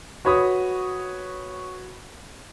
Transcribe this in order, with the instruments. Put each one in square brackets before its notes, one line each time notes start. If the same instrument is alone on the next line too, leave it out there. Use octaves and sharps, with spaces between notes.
[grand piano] F#4 B4 C#5 B5 D#6